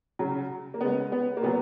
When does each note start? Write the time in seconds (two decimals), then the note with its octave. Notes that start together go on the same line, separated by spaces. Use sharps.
0.19 C#3 F#3
0.74 A#3
0.81 C#3 G#3 B3
1.12 B3
1.37 A#3
1.43 A#2 F#3 B3